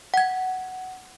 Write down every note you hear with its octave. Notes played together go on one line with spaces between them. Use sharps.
F#5 G#6